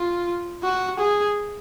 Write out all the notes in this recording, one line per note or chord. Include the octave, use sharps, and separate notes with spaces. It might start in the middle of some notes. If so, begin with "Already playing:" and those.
Already playing: F4
F#4
G#4